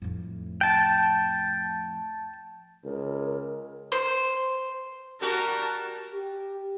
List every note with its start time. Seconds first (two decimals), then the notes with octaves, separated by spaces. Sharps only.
0.02 F2 A2
0.61 G5 A5
2.84 C#2 A#4
3.92 C5
5.21 G3 F#4 G4 A#4 A5
6.13 G4